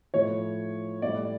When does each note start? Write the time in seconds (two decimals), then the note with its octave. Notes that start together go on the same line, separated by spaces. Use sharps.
0.14 A2 F3 C#5
1.02 A2 G3 D5